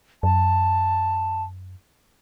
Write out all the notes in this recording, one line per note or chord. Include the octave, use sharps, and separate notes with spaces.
F#2 A5